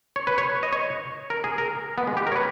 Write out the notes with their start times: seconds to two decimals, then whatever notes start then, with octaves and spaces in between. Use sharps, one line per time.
0.16 C#5
0.27 B4
0.38 C#5
0.63 D#5
0.72 C#5
1.30 A#4
1.44 G#4
1.58 A#4
1.98 B3
2.07 G#3
2.17 G4
2.27 A#4
2.32 C#5
2.36 B4